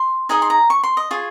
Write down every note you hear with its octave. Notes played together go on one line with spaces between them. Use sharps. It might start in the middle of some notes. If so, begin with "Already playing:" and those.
Already playing: C6
D#4 G#4 D#5 G#5
C6
A#5
C#6
C6
D#5
F4 G#4 C#5